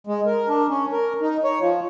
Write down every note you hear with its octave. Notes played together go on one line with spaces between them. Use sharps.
G#3
A#4
D4
C#4
A#4
D#4
C#5
F3